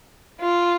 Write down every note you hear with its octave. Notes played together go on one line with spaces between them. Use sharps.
F4